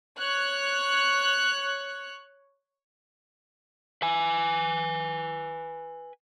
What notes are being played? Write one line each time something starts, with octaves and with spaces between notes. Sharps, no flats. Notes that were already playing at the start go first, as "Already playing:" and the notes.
C#5 F#6
B4 G#5